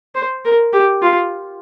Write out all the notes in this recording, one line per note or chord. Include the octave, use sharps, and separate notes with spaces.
C5
A#4
G4
F4